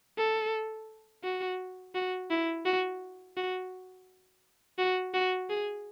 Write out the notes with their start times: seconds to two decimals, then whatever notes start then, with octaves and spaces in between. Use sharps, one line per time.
0.18 A4
1.24 F#4
1.95 F#4
2.31 E4
2.65 F#4
3.37 F#4
4.79 F#4
5.14 F#4
5.49 G#4